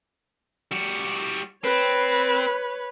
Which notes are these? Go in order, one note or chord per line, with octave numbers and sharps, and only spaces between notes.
G3 F#4
C4 B4 C#5